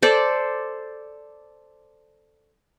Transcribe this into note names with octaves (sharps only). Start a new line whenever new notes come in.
A4 C5 D5